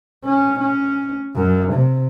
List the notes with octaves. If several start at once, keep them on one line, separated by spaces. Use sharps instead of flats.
C#4
C#4
F#2
C3